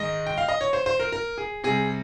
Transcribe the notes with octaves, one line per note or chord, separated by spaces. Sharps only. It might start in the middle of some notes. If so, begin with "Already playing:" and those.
Already playing: G#2 D#3 G#3 D#5
G5
F5
D#5
C#5
C5
C5
A#4
A#4
G#4
C3 G3 G#4